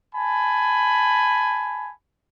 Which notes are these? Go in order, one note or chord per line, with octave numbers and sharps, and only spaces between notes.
G#5 A5 B5